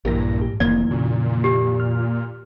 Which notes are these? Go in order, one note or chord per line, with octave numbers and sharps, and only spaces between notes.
A#1 G2 A#2 E3 G4 A#4 A#6
G#2 G4
F1 F2 D#3 E3 A#3 D5
A#2 C#3 F#4
G4
F6